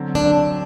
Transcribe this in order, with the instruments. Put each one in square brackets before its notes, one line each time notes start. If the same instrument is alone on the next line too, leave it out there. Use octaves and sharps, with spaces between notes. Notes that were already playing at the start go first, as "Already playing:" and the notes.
Already playing: [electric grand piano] D3 F#3 C4
[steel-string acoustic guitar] D4